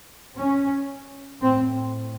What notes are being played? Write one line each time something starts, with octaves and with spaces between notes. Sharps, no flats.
C#4
A2 C4